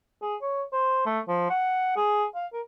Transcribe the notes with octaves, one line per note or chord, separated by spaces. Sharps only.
G#4
C#5
C5
A3
F3
F#5
G#4
F5
A#4